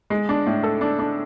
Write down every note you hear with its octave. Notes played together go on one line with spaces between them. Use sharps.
G#3
D4
A2
A4
D4
D4